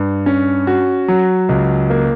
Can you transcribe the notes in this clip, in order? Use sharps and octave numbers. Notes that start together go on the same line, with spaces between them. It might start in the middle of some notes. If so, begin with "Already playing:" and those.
Already playing: G2
C#4
F#4
F#3
C#2
A#3